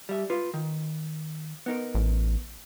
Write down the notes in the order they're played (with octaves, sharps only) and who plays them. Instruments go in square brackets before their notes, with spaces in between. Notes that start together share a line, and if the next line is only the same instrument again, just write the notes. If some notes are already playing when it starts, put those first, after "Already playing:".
[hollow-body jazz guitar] G3 E5
F4 B4
D#3
B3 D#4 A#4
[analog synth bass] A1